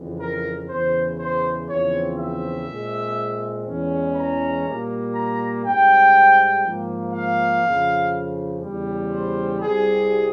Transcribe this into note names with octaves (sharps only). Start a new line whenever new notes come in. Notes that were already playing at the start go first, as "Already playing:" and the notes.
Already playing: F2 C#3 E3
A#4
E2 C#3 E3 C5
C5
E2 C#3 F3 C4 C#5
E5
A#2 G#3 C4
E2 E3 G#3 C#4
A#5
A#2 G3 A#3
A#5
G#2 G3 C4 G5
G#2 F3 A#3
F5
F2 C#3 F3
E2 C#3 E3 G3
C5
C2 C3 G3 C4 G#4